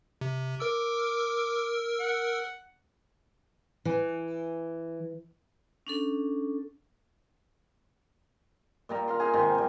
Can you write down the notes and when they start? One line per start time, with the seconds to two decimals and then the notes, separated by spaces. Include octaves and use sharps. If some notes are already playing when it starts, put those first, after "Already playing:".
0.21 C3
0.60 A#4 D6 E6
2.00 F#5
3.85 E3
5.87 C#4 D4 A4
8.89 A#2 G3 A#5
9.08 F5 A#5 C6
9.20 D#4 G#4 F5 G#5
9.33 G#2 C3 D#3
9.55 C3 G3